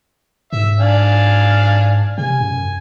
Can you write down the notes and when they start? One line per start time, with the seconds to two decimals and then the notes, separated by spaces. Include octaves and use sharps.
0.53 G#2 E5
0.80 D4 F5 G#5
2.18 C3 G#5
2.41 F#2